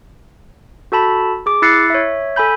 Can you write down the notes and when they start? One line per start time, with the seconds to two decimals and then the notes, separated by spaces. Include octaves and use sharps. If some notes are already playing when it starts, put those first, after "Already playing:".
0.92 F#4 A4 A5 B5
1.46 G#4 D6
1.62 E4 E6 F#6 A6 C7 C#7
1.90 C#5 E5
2.36 A4 G#5 B5 G6